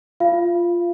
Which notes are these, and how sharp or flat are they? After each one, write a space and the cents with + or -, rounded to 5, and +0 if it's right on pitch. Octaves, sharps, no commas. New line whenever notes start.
F4 -5 F5 -30